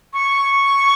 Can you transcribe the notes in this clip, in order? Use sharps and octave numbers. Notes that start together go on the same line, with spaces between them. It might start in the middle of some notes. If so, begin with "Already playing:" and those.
C#6